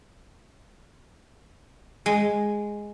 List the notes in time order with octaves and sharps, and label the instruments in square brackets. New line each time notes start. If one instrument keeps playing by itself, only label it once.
[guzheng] G#3